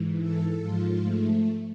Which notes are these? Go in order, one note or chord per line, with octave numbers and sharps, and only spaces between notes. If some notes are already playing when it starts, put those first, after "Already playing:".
Already playing: G#2 E3
A4
G#2 F3 F4
A3